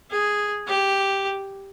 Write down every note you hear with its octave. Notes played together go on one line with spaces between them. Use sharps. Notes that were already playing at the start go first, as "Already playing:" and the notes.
G#4
G4